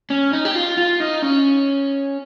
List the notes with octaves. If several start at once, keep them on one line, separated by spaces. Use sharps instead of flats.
C#4
D#4
G4
F4
F4
D#4
C#4